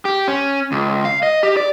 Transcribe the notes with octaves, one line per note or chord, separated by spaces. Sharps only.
G4
C#4
C#2
F5
D#5
G4
D5